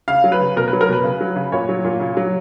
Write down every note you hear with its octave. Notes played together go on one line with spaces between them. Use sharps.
C#3 F5
F#3
B4
C#3
B2 A#4
B4
F#3
A#4
B2 B4
C#3
F#3
C#3
A#2 C#5
F#3
A#2
C#3
F#3